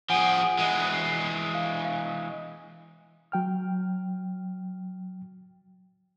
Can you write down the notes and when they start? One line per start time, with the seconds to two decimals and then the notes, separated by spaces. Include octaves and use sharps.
0.10 F3 G#4 F#5 G#5 D7
0.58 E3 G#3
0.93 C7
1.54 F5
1.85 F5
3.32 F#3 G5 F6